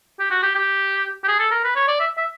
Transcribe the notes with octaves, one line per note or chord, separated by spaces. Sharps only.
G4
F#4
G4
G4
G4
G#4
A4
A#4
B4
C#5
D5
E5
E5